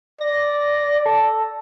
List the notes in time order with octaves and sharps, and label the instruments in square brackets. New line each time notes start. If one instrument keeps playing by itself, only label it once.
[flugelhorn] D5 [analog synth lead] A#6
[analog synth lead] A4